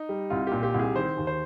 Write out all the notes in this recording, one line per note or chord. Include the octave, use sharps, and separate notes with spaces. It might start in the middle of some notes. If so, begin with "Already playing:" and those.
Already playing: D#4
G3
C2 F4
A#2 G4
G4
C2
G#4
D#3 C5
D#2
C5